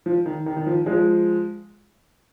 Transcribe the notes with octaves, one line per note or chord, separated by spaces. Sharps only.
F3
D#3
D#3
D#3
F3
F3 G#3